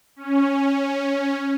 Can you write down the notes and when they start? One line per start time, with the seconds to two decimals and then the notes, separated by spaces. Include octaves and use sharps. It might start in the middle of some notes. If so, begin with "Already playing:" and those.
0.16 C#4